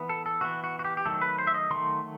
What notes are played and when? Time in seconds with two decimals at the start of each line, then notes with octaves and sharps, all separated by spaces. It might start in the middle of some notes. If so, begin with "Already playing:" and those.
Already playing: E3 B3
0.09 A4
0.26 A4
0.41 E3 B3 F#4
0.64 F#4
0.79 F#4
0.85 G4
0.97 G4
1.06 D#3 F#3 A3 A4
1.22 B4
1.38 C5
1.47 E5
1.54 D#5
1.70 D#3 F#3 A3 C6